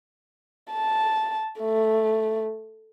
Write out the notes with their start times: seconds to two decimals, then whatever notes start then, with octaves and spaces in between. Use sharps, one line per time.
0.72 A5
1.60 A3